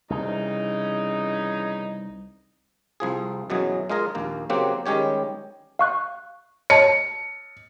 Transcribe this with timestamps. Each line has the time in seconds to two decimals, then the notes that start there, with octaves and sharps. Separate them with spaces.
0.10 C2 C#3 E3 D#4
3.00 C2 F3 G#4
3.50 F#2 B2 E3 F#3 G#4
3.90 G#3 F4 G#4 A#4 D#5
4.15 A#1 D#2 A#3
4.50 C#3 F#3 A#3 C4 G4 F#5
4.86 D#3 G3 G#3 C#4 G4 C#5
5.79 F5 C#6 F#6
6.70 C#5 A5 C#7